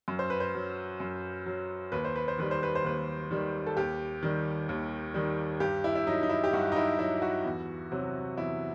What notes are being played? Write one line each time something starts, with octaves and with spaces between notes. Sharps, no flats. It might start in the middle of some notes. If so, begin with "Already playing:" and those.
F#2
C5
B4
C5
F#3
F#2
F#3
D#2 B4
C5
B4
C5
D#3 G3 B4
C5
B4
C5
D#2 B4
D#3 G3
A4
D#2 G4
D#3 G3
D#2
D#3 G3
G2 G4
E4
E4
F#3 D#4
D#4
E4
G4
G2 F#4
D#4
E4
F#3 E4
F#4
E2
C3 F#3
E2 E4